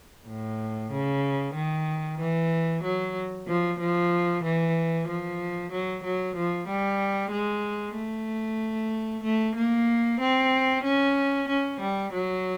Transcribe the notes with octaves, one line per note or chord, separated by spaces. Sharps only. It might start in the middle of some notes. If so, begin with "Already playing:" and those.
A2
C#3
D#3
E3
F#3
F3
F3
E3
F3
F#3
F#3
F3
G3
G#3
A3
A3
A#3
C4
C#4
C#4
G3
F#3